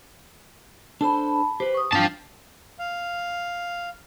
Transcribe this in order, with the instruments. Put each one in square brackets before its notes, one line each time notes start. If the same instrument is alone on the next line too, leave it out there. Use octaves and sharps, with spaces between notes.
[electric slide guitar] D4 A4 C5 [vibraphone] A5 B5
[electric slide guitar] G4 B4 [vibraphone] C5
[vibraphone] C#6 D#6
[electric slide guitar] G2 C4 G5 [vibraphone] D4 [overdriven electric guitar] F4 A5
[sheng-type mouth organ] F5